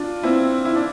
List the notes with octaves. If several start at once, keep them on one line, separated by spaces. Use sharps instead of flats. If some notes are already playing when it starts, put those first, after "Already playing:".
Already playing: D4 F4
C4 E4
E4
D4